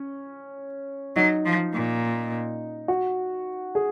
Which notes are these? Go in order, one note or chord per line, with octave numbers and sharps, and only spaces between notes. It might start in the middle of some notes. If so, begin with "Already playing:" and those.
Already playing: C#4
F#3 D#4
F3
A#2
F#4
G#4